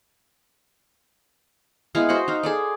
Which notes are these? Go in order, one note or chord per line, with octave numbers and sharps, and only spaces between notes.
G#3 B3 E4 F5
F#4 C5 D#5 F#5
D#4 F5
G#4 A4 D5